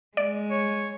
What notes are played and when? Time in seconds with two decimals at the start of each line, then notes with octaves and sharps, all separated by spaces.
0.17 G#3 D5
0.50 C#5